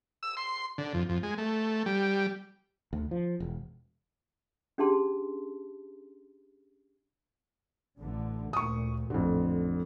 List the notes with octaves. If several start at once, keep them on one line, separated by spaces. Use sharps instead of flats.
E6
C6
D3
F2
F2
G#3
A3
G3
D2
F3
E1
C#4 D4 G4 G#4 A5 C6
A1 D3
D2 A#2 C#6 D#6
A1 F2 D3